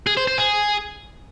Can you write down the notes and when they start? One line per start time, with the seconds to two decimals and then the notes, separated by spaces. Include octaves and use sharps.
0.07 G#4
0.17 C5
0.28 C5
0.38 G#4